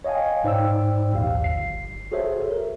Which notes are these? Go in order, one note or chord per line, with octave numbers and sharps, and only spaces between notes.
C#5 D#5 F5 G5 G#5
G#2 D#4 C5 D5 G5 E6
A#1 D#2 G4 F5
G1 C7
F#4 G#4 A4 C5 C#5 E5
A#4